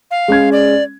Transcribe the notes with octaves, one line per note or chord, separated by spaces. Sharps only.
F5
G#3 C#4 G#6
D5